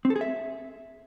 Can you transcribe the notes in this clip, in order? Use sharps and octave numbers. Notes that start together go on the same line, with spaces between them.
C4
A4
G#4
E5